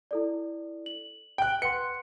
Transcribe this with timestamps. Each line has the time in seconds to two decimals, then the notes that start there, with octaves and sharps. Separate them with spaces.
0.11 E4 A4 D5
0.86 F#7
1.38 G5 F#6
1.62 B4 F#5 C6 C#7